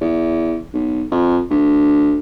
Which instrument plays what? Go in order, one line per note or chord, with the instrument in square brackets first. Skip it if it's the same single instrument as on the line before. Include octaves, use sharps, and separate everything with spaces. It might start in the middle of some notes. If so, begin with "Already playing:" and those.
[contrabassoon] E2
B1
F2
D2